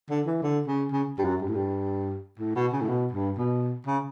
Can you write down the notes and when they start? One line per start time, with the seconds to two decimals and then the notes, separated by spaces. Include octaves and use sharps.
0.10 D3
0.26 E3
0.42 D3
0.67 C#3
0.91 C#3
1.18 G2
1.24 F#2
1.41 G2
1.48 A2
1.55 G2
2.39 A2
2.55 B2
2.73 C#3
2.81 A2
2.89 B2
3.13 G2
3.38 B2
3.86 C#3